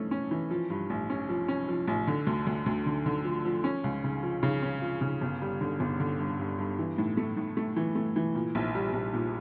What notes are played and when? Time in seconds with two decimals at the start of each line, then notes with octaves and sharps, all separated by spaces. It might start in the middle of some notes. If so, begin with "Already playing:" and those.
Already playing: F2 E3 A3 C#4
0.11 C#4
0.31 E3
0.51 F3
0.70 G2
0.90 A1
1.10 C#4
1.29 F3
1.48 C#4
1.68 F3
1.88 A1
2.07 D3
2.27 D2
2.47 D2
2.66 D2
2.86 D3
3.06 D3
3.25 F3
3.45 F3
3.64 C#4
3.84 C#2
4.04 C#3
4.23 F3
4.43 C#3
4.63 C#4
4.82 F3
5.01 C#3
5.21 G1
5.42 G3
5.61 D3
5.80 G1
6.00 D3
6.19 G2
6.39 G2
6.59 G2
6.78 E3
6.98 A2
7.17 A3
7.37 A2
7.57 A3
7.76 E3
7.95 A3
8.16 E3
8.35 A#2
8.55 A#1
8.75 G3
8.93 A#1
9.14 A#2